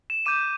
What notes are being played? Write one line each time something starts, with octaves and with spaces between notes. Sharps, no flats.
E7
D6 G6 D#7